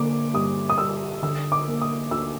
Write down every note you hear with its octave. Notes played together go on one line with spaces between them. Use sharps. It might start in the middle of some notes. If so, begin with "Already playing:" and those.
Already playing: D3 A#3 D6
G2 D#6
D#6
G3 E6
D3 E6
D6
A#3
D#6
D2 E6